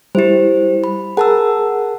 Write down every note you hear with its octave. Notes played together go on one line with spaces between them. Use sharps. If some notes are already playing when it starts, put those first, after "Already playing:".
G3 E4 G4 C5
B5
G#4 A#4 F#5 A5 E6